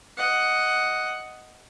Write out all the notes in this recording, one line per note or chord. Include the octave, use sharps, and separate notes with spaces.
D#5 F#5